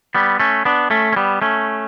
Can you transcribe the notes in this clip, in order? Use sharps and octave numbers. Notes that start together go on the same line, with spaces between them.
G3 B3
A3 C#4
B3 D4
A3 C#4
C#4
G3 B3
A3 C#4